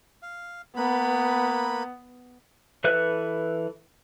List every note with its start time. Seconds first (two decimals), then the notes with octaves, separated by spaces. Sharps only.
0.22 F5
0.76 A#3 B3 B4 B5
2.84 E3 A4 B4 E5 F#6